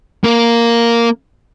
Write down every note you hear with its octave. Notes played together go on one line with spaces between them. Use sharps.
A#3 A#4